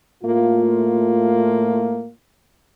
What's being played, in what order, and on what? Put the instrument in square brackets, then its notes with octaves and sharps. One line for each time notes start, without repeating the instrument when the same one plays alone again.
[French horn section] A2 A3 A#3 F4